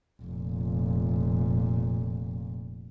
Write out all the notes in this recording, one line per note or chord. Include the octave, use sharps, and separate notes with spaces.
F1 A#2